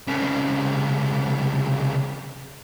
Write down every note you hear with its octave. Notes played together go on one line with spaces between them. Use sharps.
C2 C#3